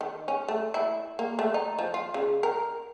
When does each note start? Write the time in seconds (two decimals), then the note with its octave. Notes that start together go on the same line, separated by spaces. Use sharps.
0.01 D#3
0.28 C#4
0.48 A3
0.74 E4
1.19 A#3
1.39 A3
1.54 D#4
1.79 F3
1.94 F4
2.14 C#3
2.43 A#4